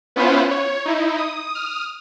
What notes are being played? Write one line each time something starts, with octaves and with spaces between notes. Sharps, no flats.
B3 C#4 E4 F4 B4 C5
C#5
D#4 E4
D#6
D#6 F6